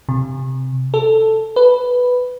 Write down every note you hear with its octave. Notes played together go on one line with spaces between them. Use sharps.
C3
A4
B4